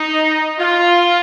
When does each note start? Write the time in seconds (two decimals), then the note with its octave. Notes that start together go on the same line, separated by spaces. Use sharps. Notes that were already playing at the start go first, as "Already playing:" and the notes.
Already playing: D#4
0.59 F4